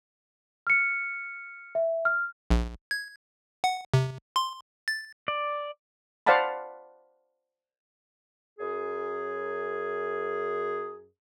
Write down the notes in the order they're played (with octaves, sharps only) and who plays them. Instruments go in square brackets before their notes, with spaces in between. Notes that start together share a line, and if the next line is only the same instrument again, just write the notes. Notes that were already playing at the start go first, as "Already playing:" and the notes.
[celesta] F6 C#7
E5
F6
[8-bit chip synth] A#1
G#6
F#5
C3
C6
A6
[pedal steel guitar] D5
[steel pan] C5 D5 F5 F#5 A5 B5
[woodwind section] F#2 G#4